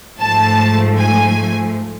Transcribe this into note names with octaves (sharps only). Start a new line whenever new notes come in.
G#2 F3 A3 A5
G#5